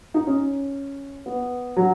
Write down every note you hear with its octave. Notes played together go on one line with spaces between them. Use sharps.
D#4
C#4
B3
F#3